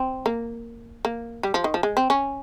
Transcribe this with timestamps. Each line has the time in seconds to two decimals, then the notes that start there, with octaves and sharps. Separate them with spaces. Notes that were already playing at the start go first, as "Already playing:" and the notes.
Already playing: C4
0.26 A#3
1.05 A#3
1.43 G3
1.54 F3
1.64 D#3
1.74 F3
1.83 G#3
1.97 C4
2.10 C#4